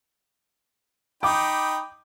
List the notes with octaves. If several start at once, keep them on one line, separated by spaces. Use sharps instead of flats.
D#4 G5 B5 D6